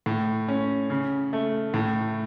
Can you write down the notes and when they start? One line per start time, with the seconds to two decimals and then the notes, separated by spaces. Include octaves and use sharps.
0.06 A2
0.48 C#4
0.90 C#3
1.33 A3
1.74 A2